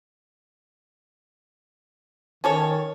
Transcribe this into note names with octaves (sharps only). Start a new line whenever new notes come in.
D#3 C#4 A4 C#5